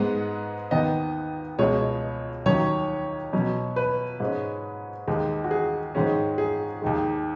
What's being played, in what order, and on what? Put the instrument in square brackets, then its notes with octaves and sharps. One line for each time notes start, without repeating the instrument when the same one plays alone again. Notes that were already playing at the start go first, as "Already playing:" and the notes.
Already playing: [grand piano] G#2 G#3 B3 F#5
D#2 D#3 B3 D#5
C#2 B2 G#3 C#5
D#2 D#3 F#3 C#4 C#5
B2 F#3 C#4
B4
G#2 G#3 C#4
D#2 D#3 G#3
F#4
G#4
G#2 D#3 G#3 C#4
G#4
D#2 D#3 G#3